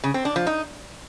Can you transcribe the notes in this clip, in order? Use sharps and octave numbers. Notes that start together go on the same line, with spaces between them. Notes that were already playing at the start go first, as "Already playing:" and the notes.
C#3
C4
D4
F3
D#4